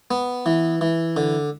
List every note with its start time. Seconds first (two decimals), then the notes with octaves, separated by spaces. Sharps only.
0.11 B3
0.46 E3
0.81 E3
1.16 D3